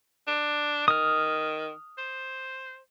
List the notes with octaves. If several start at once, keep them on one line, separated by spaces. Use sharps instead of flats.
D4
D#3 D#6 F6
C5